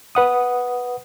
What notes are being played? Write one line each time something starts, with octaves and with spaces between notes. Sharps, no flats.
B4 F#5 D#6